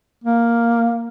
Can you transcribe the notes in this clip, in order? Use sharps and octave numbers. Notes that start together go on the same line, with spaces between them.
A#3